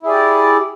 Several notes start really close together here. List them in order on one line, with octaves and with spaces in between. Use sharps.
E4 G#4 D5 G4